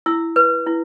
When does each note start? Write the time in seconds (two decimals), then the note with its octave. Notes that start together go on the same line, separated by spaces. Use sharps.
0.06 E4 E6
0.36 B4
0.66 E4